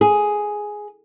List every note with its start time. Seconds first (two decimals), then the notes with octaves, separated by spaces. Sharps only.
0.01 G#4